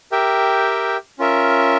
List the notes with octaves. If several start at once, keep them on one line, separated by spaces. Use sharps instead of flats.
G4 A#4 E5 G5
C#4 F4 A#4 E5